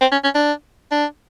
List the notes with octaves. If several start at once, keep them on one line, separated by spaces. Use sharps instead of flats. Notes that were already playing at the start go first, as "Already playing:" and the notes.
C4
C#4
C#4
D4
D4